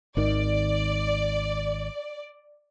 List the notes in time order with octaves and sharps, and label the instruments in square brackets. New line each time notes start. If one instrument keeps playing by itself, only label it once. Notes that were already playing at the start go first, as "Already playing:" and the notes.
[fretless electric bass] G#1 D#3 [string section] D5